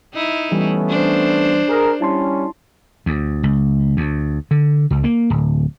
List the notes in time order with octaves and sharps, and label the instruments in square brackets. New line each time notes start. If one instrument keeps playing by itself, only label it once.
[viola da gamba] D#4 E4
[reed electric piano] E3 G3 [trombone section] A3 B3 C#4
[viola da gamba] D4 C5
[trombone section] G#4 A#4
[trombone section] G3 C#4 [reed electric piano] E4 A5 C6
[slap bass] D2
C#2
D2
D3
C#2
A#3
D1